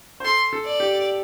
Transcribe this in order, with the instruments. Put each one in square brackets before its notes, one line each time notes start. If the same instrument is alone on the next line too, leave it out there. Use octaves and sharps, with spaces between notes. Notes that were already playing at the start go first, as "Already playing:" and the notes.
[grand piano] C5
[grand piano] A4 [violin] C6
[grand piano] A4
[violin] D5
[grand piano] G4